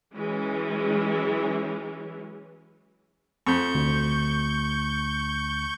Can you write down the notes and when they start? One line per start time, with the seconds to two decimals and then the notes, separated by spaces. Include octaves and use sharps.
0.14 E3 F#3 G#3 C#4
3.46 F2 C#6 G6
3.75 D2